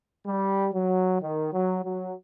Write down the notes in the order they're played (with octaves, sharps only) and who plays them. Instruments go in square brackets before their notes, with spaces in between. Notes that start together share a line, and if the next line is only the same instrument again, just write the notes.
[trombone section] G3
F#3
D#3
F#3
F#3